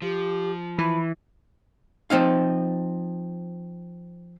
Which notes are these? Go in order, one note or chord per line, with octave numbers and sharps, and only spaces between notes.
F3 G4
E3 B5
F3 C4 D#4 F5